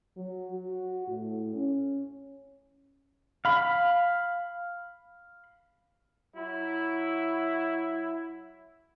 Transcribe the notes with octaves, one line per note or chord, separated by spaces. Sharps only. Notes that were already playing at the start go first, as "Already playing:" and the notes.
F#3
F#4
A2
C#4
F5 B5
F#3 E4